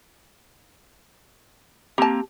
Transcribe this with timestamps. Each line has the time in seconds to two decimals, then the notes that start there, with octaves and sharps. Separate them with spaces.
1.98 A#3 C4 G4 A5 A#5